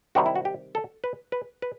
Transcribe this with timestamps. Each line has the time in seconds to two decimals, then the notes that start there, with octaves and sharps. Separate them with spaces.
0.15 C3 D#3 G3 F#4
0.26 E4
0.35 F#4
0.45 G4
0.75 A4
1.04 B4
1.32 B4
1.62 B4